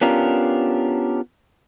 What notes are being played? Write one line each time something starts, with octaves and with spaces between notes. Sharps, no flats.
B3 C#4 D4 F4 G4 A#4